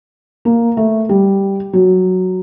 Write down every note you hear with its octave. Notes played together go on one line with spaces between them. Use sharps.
A#3
A3
G3
F#3